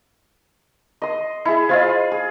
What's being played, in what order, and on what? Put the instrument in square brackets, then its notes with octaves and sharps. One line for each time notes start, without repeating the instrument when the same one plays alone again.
[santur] D#5 C6
[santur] E4 G#4 [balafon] E5
[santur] F4 G#4 F5 [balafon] C5 D#5
[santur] G#4